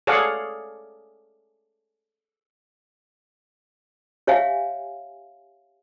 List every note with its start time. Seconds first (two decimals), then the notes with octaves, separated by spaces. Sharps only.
0.07 G#4 A4 C#5 D5 F5 F#5
4.27 G4 C#5 E5 F5 G#5